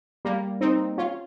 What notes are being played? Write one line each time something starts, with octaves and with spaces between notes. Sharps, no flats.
G3 A#3
C4 D#4
C#4 F4